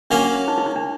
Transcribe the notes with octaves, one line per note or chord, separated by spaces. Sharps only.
F#3 A#3 C#4 D4
D#4
E4
D#4
D4